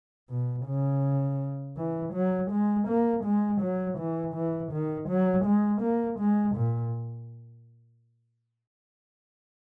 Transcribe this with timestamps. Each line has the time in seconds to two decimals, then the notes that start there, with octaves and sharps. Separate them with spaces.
0.30 B2
0.66 C#3
1.77 E3
2.14 F#3
2.51 G#3
2.88 A#3
3.25 G#3
3.61 F#3
3.98 E3
4.35 E3
4.72 D#3
5.09 F#3
5.45 G#3
5.82 A#3
6.20 G#3
6.56 A#2